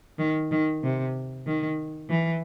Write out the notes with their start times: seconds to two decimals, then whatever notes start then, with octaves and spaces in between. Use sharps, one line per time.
0.19 D#3
0.52 D#3
0.84 C3
1.46 D#3
2.10 E3